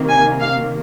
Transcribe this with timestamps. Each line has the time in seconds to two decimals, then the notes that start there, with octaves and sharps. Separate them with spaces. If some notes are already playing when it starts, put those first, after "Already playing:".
Already playing: C3 D#3 A#3
0.10 G#5
0.40 F5